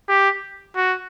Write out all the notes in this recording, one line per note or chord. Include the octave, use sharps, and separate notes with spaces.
G4
F#4